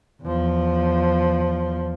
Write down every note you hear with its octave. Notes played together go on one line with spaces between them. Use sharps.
E2 F3